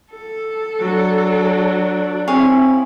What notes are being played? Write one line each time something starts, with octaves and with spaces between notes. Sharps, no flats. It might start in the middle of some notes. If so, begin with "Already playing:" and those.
A4
F#3 D4
C4 E4 G#4 C#5 F5